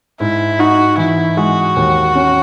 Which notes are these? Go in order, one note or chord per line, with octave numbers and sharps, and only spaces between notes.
G#2 E4
D#4 F#4
E3 E4
G#3 F#4
D#2
C#4